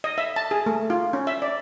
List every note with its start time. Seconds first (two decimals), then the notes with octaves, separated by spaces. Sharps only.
0.04 D#5
0.18 E5
0.36 A5
0.51 G#4
0.66 A3
0.90 F4
1.13 C#4
1.27 E5
1.42 D5